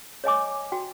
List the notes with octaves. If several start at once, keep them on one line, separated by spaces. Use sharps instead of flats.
C#5 D#5 G#5 D6
F#4 G5